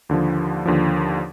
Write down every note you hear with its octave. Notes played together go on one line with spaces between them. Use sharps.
D#2 D3 F3
D#2 D3 F3